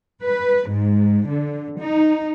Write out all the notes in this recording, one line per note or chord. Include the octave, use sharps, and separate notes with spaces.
B4
G#2
D3
D#4